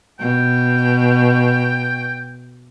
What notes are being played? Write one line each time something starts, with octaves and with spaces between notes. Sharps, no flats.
B2 G5